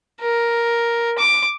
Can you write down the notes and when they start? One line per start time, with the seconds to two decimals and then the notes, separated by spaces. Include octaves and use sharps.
0.21 A#4
1.18 D6